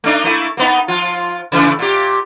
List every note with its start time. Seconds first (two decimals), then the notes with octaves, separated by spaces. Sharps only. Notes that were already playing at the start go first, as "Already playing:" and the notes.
0.04 A3 D4 D#4
0.24 A3 A#3 E4
0.57 A#3 B3 D#4
0.88 F3 F4
1.52 C#3 E3 A3
1.79 A#2 G4